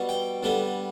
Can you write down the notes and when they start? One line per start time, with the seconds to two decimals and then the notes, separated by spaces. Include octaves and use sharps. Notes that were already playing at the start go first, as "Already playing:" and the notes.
Already playing: B2 G3 B3
0.09 G5
0.43 D3 G3 B3